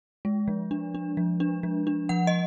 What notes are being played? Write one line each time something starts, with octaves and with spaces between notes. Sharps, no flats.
G#3
F3
D4
D4
F3
D4
F3
D4
F3 F#5
D#5